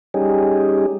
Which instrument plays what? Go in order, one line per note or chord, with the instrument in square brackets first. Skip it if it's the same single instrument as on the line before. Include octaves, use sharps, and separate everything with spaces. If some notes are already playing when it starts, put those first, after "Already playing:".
[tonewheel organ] G3 C#4 D#4 G4 G#4